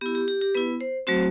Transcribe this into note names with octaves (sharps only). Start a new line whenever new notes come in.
B3 E4 G4
G4
G4
G4
B3 E4 B4
C5
F#3 A3 C4 F#4 C5